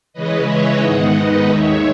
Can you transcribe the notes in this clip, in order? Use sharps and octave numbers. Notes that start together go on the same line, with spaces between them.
C#3 E3 G#3 C#4 B4 D#5
C#5 E5
G#2 D#3 G#3 B3 D#4 D#5 F#5
B4 D#5
D#2 D#3 G#3 D#4 C#5 E5